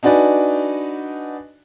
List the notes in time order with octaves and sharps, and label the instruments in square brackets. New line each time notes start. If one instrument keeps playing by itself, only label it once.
[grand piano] D4 D#4 F#4 B4 D5 G#5